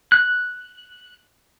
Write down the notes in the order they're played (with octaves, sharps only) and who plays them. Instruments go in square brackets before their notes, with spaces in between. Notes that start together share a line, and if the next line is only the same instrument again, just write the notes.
[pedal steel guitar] F#6